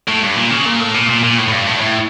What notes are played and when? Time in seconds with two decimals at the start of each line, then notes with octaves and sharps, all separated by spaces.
0.08 A2
0.23 G2
0.37 A#2
0.51 C#3
0.66 A#2
0.80 A2
0.94 A#2
1.09 A#2
1.23 A#2
1.38 A2
1.48 A2
1.52 G2
1.67 A2
1.76 G2
1.81 A2